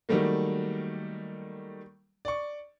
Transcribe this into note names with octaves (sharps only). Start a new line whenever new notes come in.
D#3 F#3 G3 A3 A#3
D5 C#6